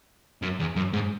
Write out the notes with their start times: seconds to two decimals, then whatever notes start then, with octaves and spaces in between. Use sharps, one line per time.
0.42 F#2
0.59 E2
0.76 F#2
0.93 G#2